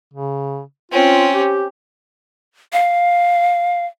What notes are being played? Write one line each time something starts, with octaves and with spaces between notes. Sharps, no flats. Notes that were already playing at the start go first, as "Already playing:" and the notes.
C#3
C4 C#4 F4
G4
F5